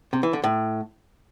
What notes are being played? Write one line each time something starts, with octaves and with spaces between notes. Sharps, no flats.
C3
E3
D3
A2